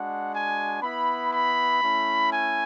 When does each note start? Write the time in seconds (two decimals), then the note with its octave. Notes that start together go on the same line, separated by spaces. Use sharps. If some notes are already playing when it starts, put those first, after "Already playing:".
Already playing: G#3 D4 F#4 F#5
0.34 G#5
0.82 B3 E4 B5
1.32 B5
1.82 A3 C#4 E4
2.31 G#5